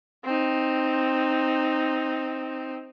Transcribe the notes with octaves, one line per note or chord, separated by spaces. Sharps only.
C4 D#4